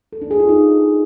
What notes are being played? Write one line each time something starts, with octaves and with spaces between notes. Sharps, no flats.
A4
D4
G#4
F4
D#4